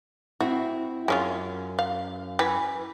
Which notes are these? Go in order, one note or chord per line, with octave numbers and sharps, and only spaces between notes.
C4 E4 F#4
F#2 G#3 C#4 F4
F5
E3 B4